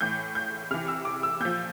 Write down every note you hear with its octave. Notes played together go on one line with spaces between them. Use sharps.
A2 E3 G6
G6
C3 E3 F6
E6
D6
E6
A#2 F3 G6